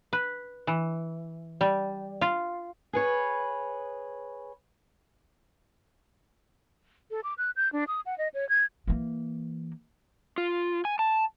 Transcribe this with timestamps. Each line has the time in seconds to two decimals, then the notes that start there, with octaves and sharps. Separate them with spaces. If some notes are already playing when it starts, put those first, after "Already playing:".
0.13 B4
0.67 E3
1.61 G3
2.21 F4
2.93 G#4 B4 C#5
7.11 A4
7.24 D6
7.38 F#6
7.56 G6
7.72 D4
7.88 D#6
8.06 F#5
8.18 D#5
8.34 C#5
8.49 G#6
8.87 E3 A#3
10.38 F4
10.85 G#5
10.99 A5